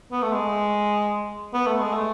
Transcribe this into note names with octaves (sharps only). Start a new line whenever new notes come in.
B3
A3
G#3
B3
A3
G#3
A3